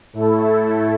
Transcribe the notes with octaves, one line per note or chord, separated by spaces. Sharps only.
A2 A3 E4 A4